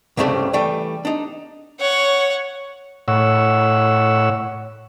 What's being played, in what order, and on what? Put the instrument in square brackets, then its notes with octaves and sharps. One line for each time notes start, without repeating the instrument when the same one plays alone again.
[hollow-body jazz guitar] C2 G2 C#3 G3 A3 C4
E3 G3 A3 G5
D4 D#4
[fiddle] C#5 F#5
[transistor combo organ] A2 C#5 F#5 E6